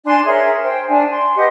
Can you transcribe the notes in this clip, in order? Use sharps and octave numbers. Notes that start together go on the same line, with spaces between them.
D4 G#5 C6
G#4 A#4 C#5 E5
C5 G5
D4 G#5
C6
G4 B4 D#5 F#5